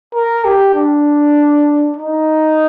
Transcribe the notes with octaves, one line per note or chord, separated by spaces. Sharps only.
A#4
G4
D4
D#4